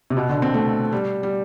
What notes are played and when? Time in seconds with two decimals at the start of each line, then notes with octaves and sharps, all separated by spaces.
0.10 C3
0.17 B2
0.29 D3
0.42 C4
0.54 A3
0.92 G3
1.23 G3